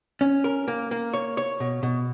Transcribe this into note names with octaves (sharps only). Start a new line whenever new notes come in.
C#4
A#4
A#3
A#3
C#5
C#5
B2
B2